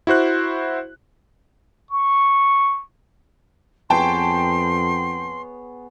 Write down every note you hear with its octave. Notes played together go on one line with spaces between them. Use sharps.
E4 F#4 C5 F#6
C#6
F2 B3 G#4 C#5 G5 A5 C6